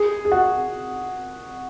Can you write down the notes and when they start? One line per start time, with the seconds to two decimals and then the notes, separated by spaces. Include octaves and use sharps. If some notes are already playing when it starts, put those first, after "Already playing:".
Already playing: G#4
0.25 G#4
0.32 F#4